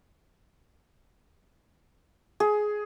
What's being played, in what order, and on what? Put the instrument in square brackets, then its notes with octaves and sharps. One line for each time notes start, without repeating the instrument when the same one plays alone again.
[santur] G#4